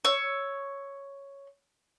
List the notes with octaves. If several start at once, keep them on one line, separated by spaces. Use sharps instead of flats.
C#5 E6